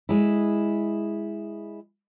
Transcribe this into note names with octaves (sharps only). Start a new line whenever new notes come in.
G#3 E4